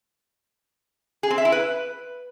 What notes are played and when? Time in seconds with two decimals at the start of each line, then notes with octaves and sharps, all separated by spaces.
1.23 G#4
1.30 C4
1.38 E5
1.45 E4
1.52 B4